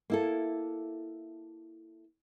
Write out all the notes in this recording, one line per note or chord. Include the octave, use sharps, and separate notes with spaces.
A#3 E4 A4